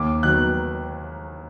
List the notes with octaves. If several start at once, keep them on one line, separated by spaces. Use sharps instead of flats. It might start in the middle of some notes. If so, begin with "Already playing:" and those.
Already playing: D#2 D6
D#3 F#3 B3 F#6